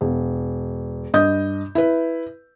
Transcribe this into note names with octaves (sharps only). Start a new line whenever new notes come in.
E1
G2 D#5 D#6 G6
E4 B4